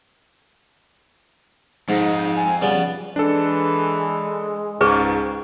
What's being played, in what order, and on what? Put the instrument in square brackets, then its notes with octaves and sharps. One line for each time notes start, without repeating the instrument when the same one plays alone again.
[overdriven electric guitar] F2 [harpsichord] G#2 [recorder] D#4
[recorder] G#5
[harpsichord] C#3 G3 B3 [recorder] D5
[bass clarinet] E3 [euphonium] G#3 [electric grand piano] D4 A4
[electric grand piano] C#2 [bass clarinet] G#2 [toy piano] G#4 B4 C#6